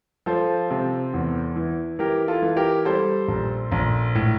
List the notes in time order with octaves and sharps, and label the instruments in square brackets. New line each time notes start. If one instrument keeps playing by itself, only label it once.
[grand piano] F3 A4 C5
C3
E2
E3
E3 G4 A#4
F4 A4
E3
G4 A#4
G3 A4 C5
A#1
A#1
A2